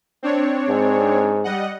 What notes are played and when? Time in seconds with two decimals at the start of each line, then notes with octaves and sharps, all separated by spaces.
0.23 C4 D4 C#5
0.69 G#2
1.44 G3 D#5 F#5